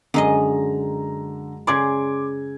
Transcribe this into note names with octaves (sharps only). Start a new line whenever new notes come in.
F#2 D3 G#3 D#5 A#5
C#3 D5 C6 D6 G#6